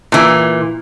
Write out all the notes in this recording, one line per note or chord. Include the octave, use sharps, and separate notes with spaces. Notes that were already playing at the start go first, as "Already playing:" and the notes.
A#2 E3